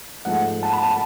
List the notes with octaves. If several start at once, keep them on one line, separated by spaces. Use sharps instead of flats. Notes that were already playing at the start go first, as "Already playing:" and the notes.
G#2 F3 A3 F#5
A5
B5
A5